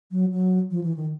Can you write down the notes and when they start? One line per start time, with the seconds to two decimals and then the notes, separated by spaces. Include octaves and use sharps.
0.11 F#3
0.31 F#3
0.71 F3
0.83 E3
0.97 D#3